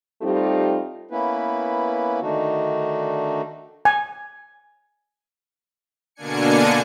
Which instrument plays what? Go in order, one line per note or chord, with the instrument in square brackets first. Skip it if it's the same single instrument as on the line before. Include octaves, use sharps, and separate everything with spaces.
[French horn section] G3 A3 C4 D#4 F4 G4
[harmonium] A#3 B3 C#4 E4 B4
D3 D#3 A3 D4 D#4 F#4
[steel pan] G#5
[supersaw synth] B2 D3 A#3 D4 G#5 C#7